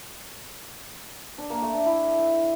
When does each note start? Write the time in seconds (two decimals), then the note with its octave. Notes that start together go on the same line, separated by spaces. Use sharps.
1.38 D4
1.50 A#3
1.62 A3
1.74 D4
1.86 E4